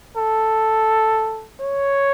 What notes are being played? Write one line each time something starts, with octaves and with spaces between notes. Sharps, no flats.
A4
C#5